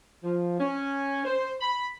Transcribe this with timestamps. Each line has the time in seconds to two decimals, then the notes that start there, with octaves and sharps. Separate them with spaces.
0.23 F3
0.60 C#4
1.25 C5
1.61 B5